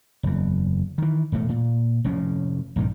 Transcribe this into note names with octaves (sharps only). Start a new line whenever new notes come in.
F#1 E2
D#3 E3
E1 A2 G#3 A3
A#2
F1 F2 A2 C#4
A#1 G2 C3 D#3